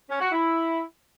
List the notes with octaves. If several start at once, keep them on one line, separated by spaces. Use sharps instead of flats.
C#4
F#4
E4